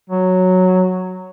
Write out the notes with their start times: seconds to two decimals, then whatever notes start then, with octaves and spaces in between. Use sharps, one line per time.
0.10 F#3